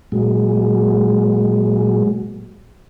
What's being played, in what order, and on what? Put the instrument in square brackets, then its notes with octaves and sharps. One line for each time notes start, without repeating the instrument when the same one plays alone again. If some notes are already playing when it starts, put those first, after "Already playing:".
[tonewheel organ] A#2 F#3 G#3